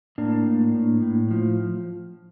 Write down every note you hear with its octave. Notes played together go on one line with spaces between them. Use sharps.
A2 A#3 D4
A2
A2
A2
F3